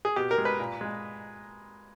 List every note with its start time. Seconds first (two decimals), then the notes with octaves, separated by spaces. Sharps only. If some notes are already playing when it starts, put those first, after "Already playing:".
0.05 G#4
0.16 B2 G4
0.31 A#4
0.38 G#3
0.45 B4
0.59 A#2
0.81 G#3